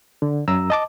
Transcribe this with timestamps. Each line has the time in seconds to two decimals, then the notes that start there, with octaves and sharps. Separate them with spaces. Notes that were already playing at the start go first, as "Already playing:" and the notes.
0.22 D3
0.48 F#2 A#5 E6
0.70 D#5 A5 D6